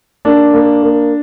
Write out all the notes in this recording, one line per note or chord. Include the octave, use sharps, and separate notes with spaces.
A#3 D4
A#3
A#3